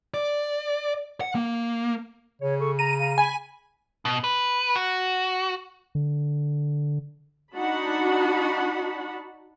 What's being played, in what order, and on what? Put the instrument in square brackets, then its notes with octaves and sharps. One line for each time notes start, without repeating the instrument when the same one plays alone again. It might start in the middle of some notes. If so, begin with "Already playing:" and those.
[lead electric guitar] D5
F#5
A#3
[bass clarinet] C#3 [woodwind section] C#5
[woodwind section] A4 C#6
[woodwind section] A#5 [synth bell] D#7
[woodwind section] F5 A#5
[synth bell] G#5 [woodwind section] B5
[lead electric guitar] B2
B4
F#4
[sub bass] D3
[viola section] D4 D#4 F#4 F#5 A5 B5